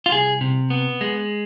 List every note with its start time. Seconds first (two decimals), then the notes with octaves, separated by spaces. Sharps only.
0.06 F4
0.12 C2 G#4
0.41 C3
0.70 B3
1.01 G#3